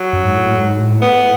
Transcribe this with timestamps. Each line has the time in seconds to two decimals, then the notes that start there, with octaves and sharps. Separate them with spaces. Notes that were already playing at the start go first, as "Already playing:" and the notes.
Already playing: F#3
0.13 F#2
0.24 G#2
0.36 A2
0.46 A2
0.58 G#2
0.79 A2
1.02 B3